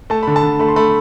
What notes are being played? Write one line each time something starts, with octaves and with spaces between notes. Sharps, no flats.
A3 A5
D3 B5
A5
D3
A3 B5
C6
A3 B5